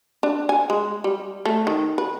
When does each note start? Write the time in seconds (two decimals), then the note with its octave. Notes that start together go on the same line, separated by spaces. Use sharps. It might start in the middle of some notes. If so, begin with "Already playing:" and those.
0.23 D4
0.49 G#5
0.70 G#3
1.04 G3
1.45 A3
1.67 D#3
1.98 B4